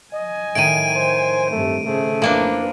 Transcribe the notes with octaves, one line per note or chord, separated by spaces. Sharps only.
D#5 G#5
A2 D#3 D7 D#7
C5
G2 C3 A3
C#3 A3 G#4 C5
F2 E3 F3 A#3 D4